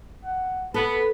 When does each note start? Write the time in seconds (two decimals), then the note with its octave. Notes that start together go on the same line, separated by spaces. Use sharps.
0.24 F#5
0.74 B3 A4 B4